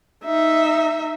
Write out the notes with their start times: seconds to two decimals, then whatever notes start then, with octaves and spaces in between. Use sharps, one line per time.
0.25 D#4 E5